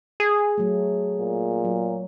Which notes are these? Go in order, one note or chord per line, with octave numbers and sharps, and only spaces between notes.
G#4
F#3 A3
A#2
F#3